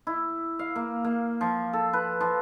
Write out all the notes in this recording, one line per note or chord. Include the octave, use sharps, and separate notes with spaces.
E4
F5
A#3
A#3
F3
A4
B4
F3